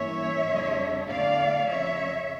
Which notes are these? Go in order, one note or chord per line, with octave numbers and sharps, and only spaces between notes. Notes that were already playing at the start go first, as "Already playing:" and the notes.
Already playing: G2 E3 A#3 C#4 C#5 E5
F2 C#3 G3 D4
E2 D3 A3 D5 F5
F2 C#3 F3 C#5 E5